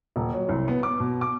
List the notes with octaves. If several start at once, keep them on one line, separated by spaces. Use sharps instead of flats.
D#1
F#3
C2
B3
D6
B2
D6